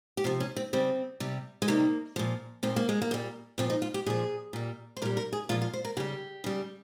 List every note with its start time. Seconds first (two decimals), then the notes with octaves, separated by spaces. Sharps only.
0.17 G4
0.24 C3 F3 F4
0.40 C#4
0.56 C4
0.73 C#3 G3 C4
1.20 C3 G3
1.62 G#3
1.68 C3 D#3 G3 A#3
2.16 A#2 F3
2.63 A#2 F3 C4
2.76 A#3
2.89 G#3
3.02 A#3
3.11 A#2 G3
3.58 A#2 F3 C4
3.70 D#4
3.82 F4
3.94 G4
4.06 A#2 F3 G#4
4.53 A#2 G3
4.97 C5
5.02 A#2 A#4
5.05 G3
5.17 A#4
5.33 G#4
5.49 A#2 F3 F4
5.62 F4
5.73 C5
5.85 A#4
5.97 C#3 G3 G4
6.44 C#3 G3